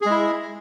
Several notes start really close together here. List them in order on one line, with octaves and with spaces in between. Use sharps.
G#4 G#3 E4